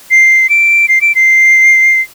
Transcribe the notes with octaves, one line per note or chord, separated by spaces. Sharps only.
C7
D7
C7
D7
C7